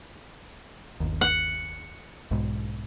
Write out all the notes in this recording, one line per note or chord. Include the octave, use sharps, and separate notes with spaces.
G1 D#2
F#5
B1 G#2